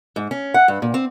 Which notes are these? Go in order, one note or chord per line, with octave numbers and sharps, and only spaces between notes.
G#2
C#4
F#5
G2
A#2
C4